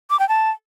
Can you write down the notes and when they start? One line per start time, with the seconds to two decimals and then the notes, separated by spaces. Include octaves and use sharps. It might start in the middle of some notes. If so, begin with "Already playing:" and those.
0.10 D6
0.20 G5
0.29 A5